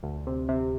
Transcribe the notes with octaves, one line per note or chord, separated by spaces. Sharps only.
D2
C3
C3